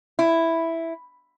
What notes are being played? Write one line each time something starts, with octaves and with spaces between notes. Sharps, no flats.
E4